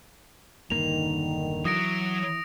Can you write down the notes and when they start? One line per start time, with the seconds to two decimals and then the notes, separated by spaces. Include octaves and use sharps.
0.70 E1 G2 D3 D#3 A#3 F7
1.65 E3 F#3 D#6 A#6 D7